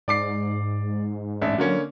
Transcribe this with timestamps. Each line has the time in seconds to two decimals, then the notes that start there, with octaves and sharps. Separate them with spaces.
0.08 G#2 D5 D6 C7
1.42 A1 D4 E5
1.58 D3 F#3 A#3 C#4